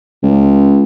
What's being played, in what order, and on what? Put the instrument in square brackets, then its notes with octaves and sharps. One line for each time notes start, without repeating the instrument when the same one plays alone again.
[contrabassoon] C#2